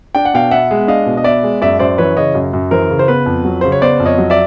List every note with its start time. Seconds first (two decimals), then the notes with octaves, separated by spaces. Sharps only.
0.15 D4 G5
0.25 F#5
0.34 B2 F5 G5
0.51 B3 E5 F#5
0.71 G#3
0.88 D4 D#5 F5
1.06 B2
1.17 D#5
1.24 B3 D5 E5
1.43 G#3
1.62 F#2 D5 E5
1.79 F#2 C5 D5
1.98 E3 B4 C#5
2.17 C#3 C#5 D#5
2.35 F#2
2.53 F#2
2.71 E3 A#4 C5
2.90 C#3
2.99 C5
3.08 B3 B4
3.26 F2
3.45 F#3
3.61 C#3 C5
3.72 C#5
3.82 B3 C5 D5
4.00 F2
4.06 C#5 D#5
4.18 F#3
4.30 D5 E5